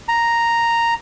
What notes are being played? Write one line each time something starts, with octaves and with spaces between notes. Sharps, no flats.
A#5